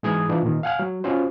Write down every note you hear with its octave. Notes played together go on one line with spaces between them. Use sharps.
G#2 E3 G#4 D#6 G#6
E3 D4 F4
A#2 D#3
F5 F#5 G#5 F6
F#3
C#4 F4 F#4 C5